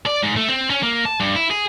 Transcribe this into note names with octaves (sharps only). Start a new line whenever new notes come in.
D5
G#2
A3
C4
C#4
A#3
A5
G2
E4
G#4